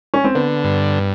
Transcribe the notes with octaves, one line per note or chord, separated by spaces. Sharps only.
C#4
C4
D3 B3
G2